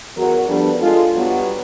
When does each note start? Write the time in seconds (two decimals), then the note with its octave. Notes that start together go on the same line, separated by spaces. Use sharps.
0.16 E2 F#3 A#4
0.47 F3 G3 B3 D4 G4 A4
0.79 G#3 F4 A4
1.16 G2 F#3 G3 B3